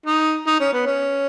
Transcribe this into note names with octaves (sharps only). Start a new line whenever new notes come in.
D#4
D#4
C#4
B3
C#4